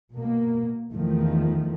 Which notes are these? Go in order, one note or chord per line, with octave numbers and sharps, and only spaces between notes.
B2 A#3
E2 D#3 F3 A3